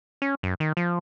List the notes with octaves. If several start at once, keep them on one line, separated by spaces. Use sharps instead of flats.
C#4
F#2
D#3
F3